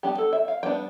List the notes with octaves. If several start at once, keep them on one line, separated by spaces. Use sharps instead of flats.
G3 B3 D4 G4
A4
E5
F5
G3 B3 D4 G5